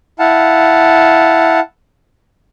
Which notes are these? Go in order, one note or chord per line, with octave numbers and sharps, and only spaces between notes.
E4 F5 F#5 A5